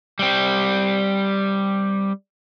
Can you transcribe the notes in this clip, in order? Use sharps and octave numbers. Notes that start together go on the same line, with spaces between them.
G3 C4